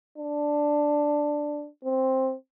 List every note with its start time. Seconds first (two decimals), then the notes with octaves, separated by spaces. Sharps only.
0.18 D4
1.85 C4